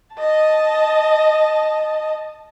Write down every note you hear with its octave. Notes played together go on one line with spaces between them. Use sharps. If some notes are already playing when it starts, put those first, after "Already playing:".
D#5 A5